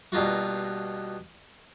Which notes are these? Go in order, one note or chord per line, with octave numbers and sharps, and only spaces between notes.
G2 B2 A#3 F4 F#4